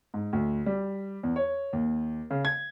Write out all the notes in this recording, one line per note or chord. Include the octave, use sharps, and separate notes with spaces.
G#2
D2
G3
E2
C#5
D#2
C#3
G#6